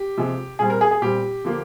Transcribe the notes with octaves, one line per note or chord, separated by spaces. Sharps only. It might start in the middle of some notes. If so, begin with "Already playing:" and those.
Already playing: G4
C3 F3 G#3
A#2 G3 C4 G#4
A#4
G#4
G#4
A#2 G3 C4 G4
D3 F3 A#3